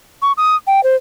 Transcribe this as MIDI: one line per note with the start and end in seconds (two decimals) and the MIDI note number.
0.22 0.32 85
0.37 0.56 87
0.67 0.83 79
0.83 0.96 72